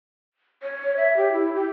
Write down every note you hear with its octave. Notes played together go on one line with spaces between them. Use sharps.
C#5
E5
G4
E4
G4